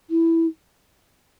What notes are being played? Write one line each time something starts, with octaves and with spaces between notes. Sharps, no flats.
E4